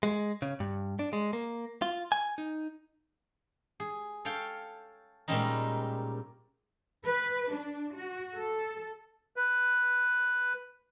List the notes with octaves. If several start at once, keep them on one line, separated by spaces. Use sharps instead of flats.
G#3
C#3
G2
D4
G#3
A#3
F4
G#5
D#4
G#4
A4 C#5 F5 G5
A#2 G3 G#3 C4 C#4 D#4
B4
D4
F#4
A4
B4